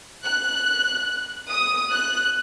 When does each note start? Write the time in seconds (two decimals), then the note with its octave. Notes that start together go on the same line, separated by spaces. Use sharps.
0.25 F#6
1.51 D#6
1.92 F#6